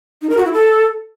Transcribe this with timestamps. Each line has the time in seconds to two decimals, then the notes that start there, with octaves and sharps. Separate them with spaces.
0.22 D#4
0.29 A#4
0.37 F#4
0.45 E4
0.53 A4